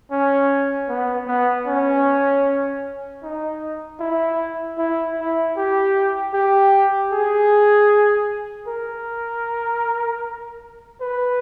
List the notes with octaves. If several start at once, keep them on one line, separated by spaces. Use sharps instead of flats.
C#4
B3
B3
C#4
D#4
E4
E4
E4
G4
G4
G#4
A#4
B4